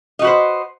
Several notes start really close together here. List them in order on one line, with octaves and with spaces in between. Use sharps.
D#5 F#4 B4 C5